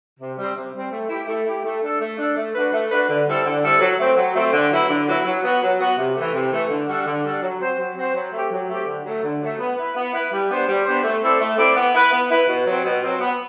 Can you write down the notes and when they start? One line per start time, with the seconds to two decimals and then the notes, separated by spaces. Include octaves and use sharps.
0.20 C3
0.38 G3 C4
0.56 C3
0.74 G3 C4
0.92 A3
1.09 E4 G4
1.28 A3
1.46 E4 G4
1.64 A3
1.83 D4 A4
2.00 A3
2.18 D4 A4
2.36 A3
2.54 D4 F#4 B4
2.73 A3
2.91 D4 F#4 B4
3.08 D3
3.27 G3 C4 E4 A4
3.45 D3
3.63 G3 C4 E4 A4
3.81 F#3
3.99 A3 C4
4.17 F#3
4.35 A3 C4
4.53 D3
4.71 F#3 B3 E4
4.89 D3
5.07 F#3 B3 E4
5.25 F#3
5.44 B3 F#4
5.62 F#3
5.80 B3 F#4
5.98 C3
6.16 E3 A3
6.34 C3
6.52 E3 A3
6.70 D3
6.88 G3 D4 F#4 A4
7.06 D3
7.24 G3 D4 F#4 A4
7.42 F#3
7.60 C4 F#4 C5
7.79 F#3
7.97 C4 F#4 C5
8.15 F#3
8.33 A3 C4 G4
8.51 F#3
8.69 A3 C4 G4
8.87 D3
9.05 F#3 A3
9.23 D3
9.41 F#3 A3
9.59 B3
9.77 E4 B4
9.96 B3
10.14 E4 B4
10.32 G3
10.50 B3 D4 G4 C5
10.68 G3
10.85 B3 D4 G4 C5
11.04 A3
11.22 C4 E4 A4 D5
11.40 A3
11.58 C4 E4 A4 D5
11.76 B3
11.95 E4 B4
12.12 B3
12.30 E4 B4
12.48 B2
12.66 F#3 C4
12.85 B2
13.03 F#3 C4
13.20 B3